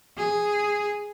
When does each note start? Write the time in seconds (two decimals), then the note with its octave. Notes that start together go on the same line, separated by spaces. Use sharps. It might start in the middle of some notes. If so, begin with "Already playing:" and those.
0.18 G#4